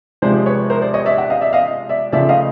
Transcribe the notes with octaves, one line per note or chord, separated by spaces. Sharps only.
C3 F3 G#3 C5 D5
B4 C#5
A#4 C5
C5 D5
C#5 D#5
D5 E5
E5 F#5
D#5 F5
D5 E5
D#5 F5
D5 E5
C#3 F3 A3 D5 E5
D#5 F5